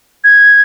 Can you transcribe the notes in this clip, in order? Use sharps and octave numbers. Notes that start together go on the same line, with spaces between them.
G#6